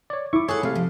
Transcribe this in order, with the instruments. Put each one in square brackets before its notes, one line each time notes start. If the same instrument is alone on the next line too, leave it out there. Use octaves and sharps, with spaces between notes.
[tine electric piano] C#5 D5
[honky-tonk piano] E4 [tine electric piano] C#6 D6
[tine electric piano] G#4 C#5 [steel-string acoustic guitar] A4 F#5
[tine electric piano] C3 F5 [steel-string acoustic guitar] A3
[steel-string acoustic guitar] F3